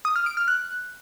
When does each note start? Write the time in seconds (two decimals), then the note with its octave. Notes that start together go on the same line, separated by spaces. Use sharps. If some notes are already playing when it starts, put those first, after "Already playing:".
0.05 D#6
0.16 F6
0.26 D7
0.37 F6
0.48 F#6